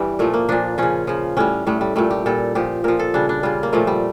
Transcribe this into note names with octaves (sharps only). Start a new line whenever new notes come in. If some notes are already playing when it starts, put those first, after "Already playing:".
Already playing: G2 E3 G3
A#2 F3 A3
A#3
A#2 F3 D4
C#3 F3 C#4
C#3 F3
A2 G3 C#4
A2 G3 A3
G3
A#2 G3 A3
G4
A#2 G3 A4
A#2 F3 G4
A#2 F3 A#4
A4
C#3 G3 D4
D4
C#3 G3 F4
A#3
A#2 F3 A3
G3